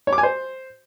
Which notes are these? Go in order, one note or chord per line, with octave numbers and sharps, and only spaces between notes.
C#5
D6
G#5
C5